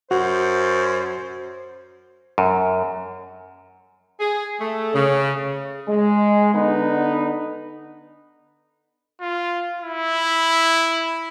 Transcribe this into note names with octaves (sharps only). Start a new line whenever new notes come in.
F#2 F#4 C5
F#2
G#4
A3
C#3
G#3
D3 B3 D#4 B4
F4
E4